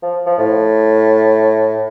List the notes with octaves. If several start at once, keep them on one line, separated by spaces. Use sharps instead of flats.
F3
F3
A2